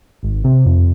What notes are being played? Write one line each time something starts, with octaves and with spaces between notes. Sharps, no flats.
G#1
C3
F2